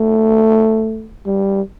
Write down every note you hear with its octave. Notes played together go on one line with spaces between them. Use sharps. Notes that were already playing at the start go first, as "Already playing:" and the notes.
Already playing: A3
G3